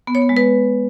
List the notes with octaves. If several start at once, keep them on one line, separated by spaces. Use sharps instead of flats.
B3
C#5
B3
G#3
B4